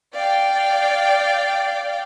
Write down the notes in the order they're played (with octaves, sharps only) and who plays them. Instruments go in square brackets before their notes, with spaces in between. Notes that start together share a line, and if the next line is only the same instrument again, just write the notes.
[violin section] D5 F5 G5